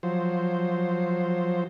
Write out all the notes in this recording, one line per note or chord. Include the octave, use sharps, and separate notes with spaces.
F3 F#3 C5